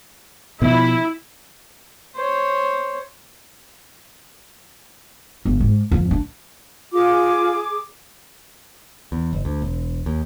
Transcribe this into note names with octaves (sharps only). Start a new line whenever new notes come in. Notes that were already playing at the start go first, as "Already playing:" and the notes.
B2 F3 E4
C5 C#5
G1
G#2
F2
D4
F4 G#4 D6
E2
F#1
D2
E1
D#2